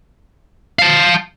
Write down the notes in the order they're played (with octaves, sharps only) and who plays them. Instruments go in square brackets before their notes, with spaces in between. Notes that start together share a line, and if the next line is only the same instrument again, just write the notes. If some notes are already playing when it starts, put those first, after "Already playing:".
[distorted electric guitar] F5 A5